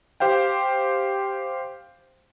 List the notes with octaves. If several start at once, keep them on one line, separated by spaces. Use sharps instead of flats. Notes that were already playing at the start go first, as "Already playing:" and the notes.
G4 C5 F5 G5